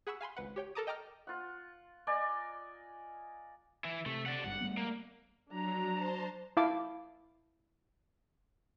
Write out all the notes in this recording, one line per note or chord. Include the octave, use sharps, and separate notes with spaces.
G#4 F#5 B5 C#6 E6
F5 G#5 B5 C6
G#1 C#2 B4 F#5
G4 C#5 G5
A4 A#4 A5 A#5 D6 D#6
D#5 G5 A5 A#5 D6 F6
F4 F#5
D5 D#5 G#5 A#5
E3 E4
C3 A3
D5 F#5
G#1 G2 F#5
G3 A3 B3
A#3
F#3 D4 A#5
C5 A5
E4 F5 A5 D6